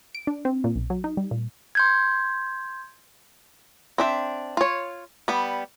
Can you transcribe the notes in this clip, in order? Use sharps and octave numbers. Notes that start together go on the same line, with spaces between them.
D7
D4
C4
A#2
B1
F#3
D#4
G3
A#2
C6 G6 G#6
C4 D4 E5
F4 C#5
G3 B3